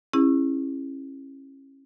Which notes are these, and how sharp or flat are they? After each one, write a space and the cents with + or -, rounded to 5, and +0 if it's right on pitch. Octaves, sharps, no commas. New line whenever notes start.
C#4 -30 E4 +0 G#4 -40